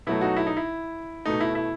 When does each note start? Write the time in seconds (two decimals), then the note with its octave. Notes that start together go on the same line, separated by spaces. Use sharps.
0.07 B2 F#3 A3 E4
0.21 D#4 F#4
0.36 E4
0.47 D#4
0.57 E4
1.25 B2 A3 D#4
1.40 E4
1.55 E4